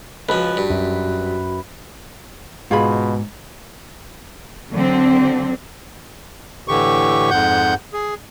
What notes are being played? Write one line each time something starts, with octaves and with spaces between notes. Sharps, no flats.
C#2 F3 F#4 B4
G2
F#2
G#2 B2 F4 G#4 B5
D3 F#3 C4
A2 D3 E3 G4 C#6
F2 G#2 F#5 G6
G#4